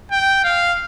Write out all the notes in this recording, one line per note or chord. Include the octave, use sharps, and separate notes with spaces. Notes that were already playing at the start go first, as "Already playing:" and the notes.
G5
F5